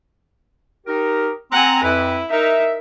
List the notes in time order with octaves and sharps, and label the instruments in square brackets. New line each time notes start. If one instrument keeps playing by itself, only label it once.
[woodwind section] D#4 G4 A#4
[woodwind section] C4 A#5 [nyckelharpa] F#5 G#5
[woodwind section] F2 B4 [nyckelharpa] E4
[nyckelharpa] D#4 A#4 [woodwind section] E5